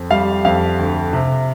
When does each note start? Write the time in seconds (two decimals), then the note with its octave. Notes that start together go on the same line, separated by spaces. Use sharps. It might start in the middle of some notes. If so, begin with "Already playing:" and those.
Already playing: F2
0.10 G3 F5
0.45 F2 F5
0.79 D2
1.13 C3